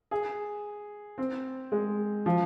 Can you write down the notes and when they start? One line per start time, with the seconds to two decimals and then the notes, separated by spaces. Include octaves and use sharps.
0.11 G#4
1.18 C4
1.72 G#3
2.26 F3